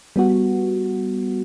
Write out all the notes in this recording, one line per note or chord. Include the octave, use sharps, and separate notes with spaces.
G3 B3 F#4